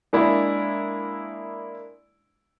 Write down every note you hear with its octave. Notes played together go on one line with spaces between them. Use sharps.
G#3 A#3 D4 E4